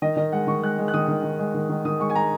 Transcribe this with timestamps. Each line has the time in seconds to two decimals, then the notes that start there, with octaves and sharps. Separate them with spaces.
0.02 D#3 D#5
0.17 D#3 D#5
0.32 G#3 F#5
0.47 D#3 C#6
0.62 G#3 F#6
0.79 G#3
0.88 F#6
0.94 D#3 D#6
1.08 D#3
1.23 D#3
1.39 G#3
1.54 D#3
1.69 D#3
1.85 D#3 D#6
2.00 G#3 C#6
2.10 G#5
2.15 G#3 A#5